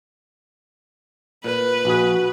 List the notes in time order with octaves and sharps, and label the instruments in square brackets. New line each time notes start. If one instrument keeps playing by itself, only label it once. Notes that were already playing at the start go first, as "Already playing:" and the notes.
[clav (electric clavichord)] A#2 [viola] B4
[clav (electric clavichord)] A#1 G#4 [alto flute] F#4